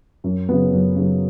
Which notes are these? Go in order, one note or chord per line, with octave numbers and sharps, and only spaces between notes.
F#2
C#3 F#3 B3
F#2
C#3 F#3 B3